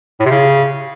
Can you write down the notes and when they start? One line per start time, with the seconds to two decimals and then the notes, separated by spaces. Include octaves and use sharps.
0.20 A2
0.25 C3
0.31 C#3